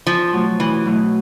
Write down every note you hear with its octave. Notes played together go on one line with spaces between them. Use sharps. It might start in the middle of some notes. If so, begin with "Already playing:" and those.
E2 F3
B2 F#3 A3
E2 E3
B2 F#3 A3